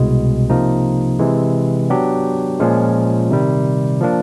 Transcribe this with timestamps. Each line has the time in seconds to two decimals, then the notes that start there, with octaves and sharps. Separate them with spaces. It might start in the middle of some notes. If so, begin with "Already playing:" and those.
Already playing: C2 B2 G#3
0.50 C3 F3 A#3 D#4
1.19 C3 E3 G#3
1.90 F#3 B3 D4 G4
2.60 A#2 F3 G#3 C#4
3.30 C3 D#3 G3
4.01 F3 A#3 D4